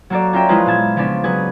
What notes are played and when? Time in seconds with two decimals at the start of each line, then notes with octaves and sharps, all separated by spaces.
0.10 F#3 A#3 F#4 A4 D5
0.33 C#4 F4 A#4 E5 G5
0.49 F3 G#3 E4 F4 G#4 B4
0.66 A#2 B3 A5 G#6
0.96 C#3 F3 B3 C#4 D4
1.24 F#3 G#4 B4 G#6